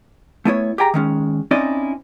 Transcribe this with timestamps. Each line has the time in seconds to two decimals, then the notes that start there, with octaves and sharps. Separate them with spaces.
0.45 A3 B3 E4 C#5
0.78 G4 G#4 G5 A#5
0.94 D#3 G#3 C#4
1.51 C4 C#4 D#4 E4 D5 D#5